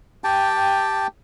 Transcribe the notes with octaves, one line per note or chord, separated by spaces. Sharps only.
G4 G5 A5